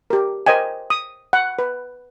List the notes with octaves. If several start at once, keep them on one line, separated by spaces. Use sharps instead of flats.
G4 A#4
A#4 C5 D#5 G5 G#5
D#6
F#5
B4